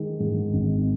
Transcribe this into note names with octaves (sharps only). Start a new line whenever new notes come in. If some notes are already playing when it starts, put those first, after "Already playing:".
Already playing: D#3 G#3
G#2
G#1